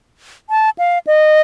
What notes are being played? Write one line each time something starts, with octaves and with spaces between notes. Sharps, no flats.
A5
F5
D#5